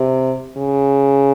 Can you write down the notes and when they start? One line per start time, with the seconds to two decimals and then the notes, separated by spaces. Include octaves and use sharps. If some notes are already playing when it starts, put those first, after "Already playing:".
Already playing: C3
0.57 C#3